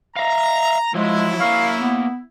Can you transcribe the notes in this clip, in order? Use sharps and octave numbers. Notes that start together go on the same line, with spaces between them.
E5 F5 A#5
F3 F#3 G#3 E4
A#3 A#4 C#5 F5
B3